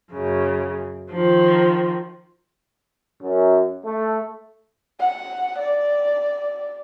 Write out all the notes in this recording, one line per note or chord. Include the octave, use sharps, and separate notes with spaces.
F#2 C#3
D#3 F3
F#2
A3
F#5
D5